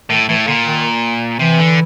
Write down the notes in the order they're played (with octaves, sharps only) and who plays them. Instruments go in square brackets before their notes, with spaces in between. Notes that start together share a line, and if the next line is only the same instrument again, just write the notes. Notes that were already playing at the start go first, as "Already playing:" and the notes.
[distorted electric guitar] A2 [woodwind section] D#3
[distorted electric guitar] A2 [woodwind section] E3
[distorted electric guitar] A#2 [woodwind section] D3
[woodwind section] D#3
[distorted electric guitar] C3 [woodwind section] E3
[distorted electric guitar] D3